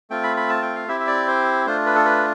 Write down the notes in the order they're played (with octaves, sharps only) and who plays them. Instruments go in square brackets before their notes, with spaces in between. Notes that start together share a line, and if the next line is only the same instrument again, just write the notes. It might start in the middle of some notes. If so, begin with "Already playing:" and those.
[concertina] A3 C4 F4 G5
B5
B5
A5
G5
F5
C4 E4 G4 E5
E5
D5
C5
A3 D4 F4 C5
B4
A4
B4